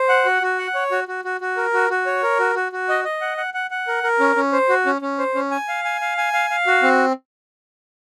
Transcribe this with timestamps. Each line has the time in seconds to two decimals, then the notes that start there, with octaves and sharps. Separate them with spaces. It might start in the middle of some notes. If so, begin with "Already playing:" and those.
Already playing: C5
0.09 F#5
0.25 F#4
0.42 F#4
0.59 F#5
0.75 C#5
0.91 F#4
1.08 F#4
1.25 F#4
1.41 F#4
1.57 A#4
1.74 F#4
1.90 F#4
2.06 C#5
2.23 A#4
2.39 F#4
2.55 F#4
2.72 F#4
2.89 D#5
3.04 D#5
3.21 F#5
3.37 F#5
3.54 F#5
3.71 F#5
3.88 A#4
4.04 A#4
4.20 C#4
4.36 C#4
4.53 C5
4.69 F#4
4.86 C#4
5.02 C#4
5.19 C5
5.35 C#4
5.51 G#5
5.68 F5
5.84 G#5
6.01 F5
6.18 G#5
6.33 F5
6.50 F5
6.67 F#4
6.83 C4